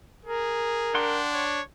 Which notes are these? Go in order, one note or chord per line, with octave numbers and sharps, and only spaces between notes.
G#4 A#4
D4 F#5 G5 C6
C#5